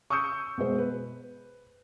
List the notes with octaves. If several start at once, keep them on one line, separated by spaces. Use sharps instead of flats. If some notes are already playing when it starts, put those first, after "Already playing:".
C#6 D#6 E6 G6 C#7
B2 G#3 C5
B4